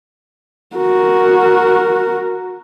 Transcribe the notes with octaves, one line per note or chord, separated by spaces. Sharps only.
F#4 A#4